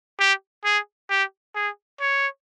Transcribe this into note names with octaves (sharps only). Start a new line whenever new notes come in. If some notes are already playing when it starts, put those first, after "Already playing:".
G4
G#4
G4
G#4
C#5